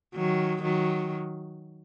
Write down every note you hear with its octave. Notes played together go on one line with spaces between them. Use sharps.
D#3 F#3
D#3 F#3